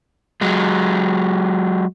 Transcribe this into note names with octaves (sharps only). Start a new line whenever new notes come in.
F#3 G#3